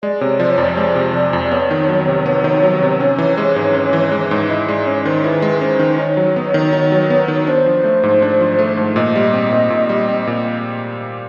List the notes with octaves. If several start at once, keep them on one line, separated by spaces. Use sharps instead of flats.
G#3 D5
C3 C#5
F3 D5
C#5
F2 D5
G#3 D5
C3
F3 D5
F2
B3 C#5
D#3
F#3
C3
B3
D#3
F#3
C3
C#4
E3
G#3
G#2
C#4
E3
G#3
G#2
E4 D#5
G#3 D5
C#4 C#5
D#3 C5
E4 B4
G#3
C#4 C5
D#3
D#4 C#5
F#3
B3
D#3
D#4
F#3
B3
D#3
D4 C5
F3
A3
G#2
D4
F3
A3
G#2
A#2 D#5
G3
C4
A#2
A#2
G3
C4
A#2